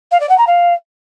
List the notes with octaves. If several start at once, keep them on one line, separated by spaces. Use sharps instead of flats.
F5
D5
F#5
A#5
F5